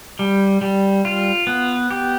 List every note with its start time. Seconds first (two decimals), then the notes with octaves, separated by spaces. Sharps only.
0.19 G3
0.61 G3
1.05 F4
1.47 B3
1.91 G4